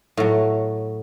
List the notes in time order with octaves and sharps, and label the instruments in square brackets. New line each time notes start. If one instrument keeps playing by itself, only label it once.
[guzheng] A2 F#3